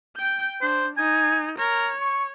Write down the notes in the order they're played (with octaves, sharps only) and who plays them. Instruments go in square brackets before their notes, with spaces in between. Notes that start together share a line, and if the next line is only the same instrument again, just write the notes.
[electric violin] G5 G6
[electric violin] D4 [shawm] C5
[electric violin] D#4 [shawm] G#5
[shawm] A#4 [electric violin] C#5
[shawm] C#6